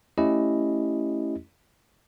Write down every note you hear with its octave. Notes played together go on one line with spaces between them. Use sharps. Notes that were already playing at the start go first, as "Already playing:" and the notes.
A3 C#4 E4 G4 D#5